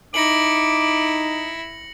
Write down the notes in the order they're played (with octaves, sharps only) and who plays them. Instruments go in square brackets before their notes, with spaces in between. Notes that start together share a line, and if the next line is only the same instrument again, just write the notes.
[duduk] D#4 [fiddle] E4 [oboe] D6 [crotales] A#6 C#7 F#7